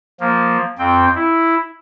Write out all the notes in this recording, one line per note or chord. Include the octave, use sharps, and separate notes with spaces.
F3 A#3
F2 C4 G5
E4